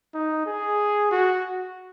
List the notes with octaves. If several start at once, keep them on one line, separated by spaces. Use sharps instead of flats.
D#4
G#4
F#4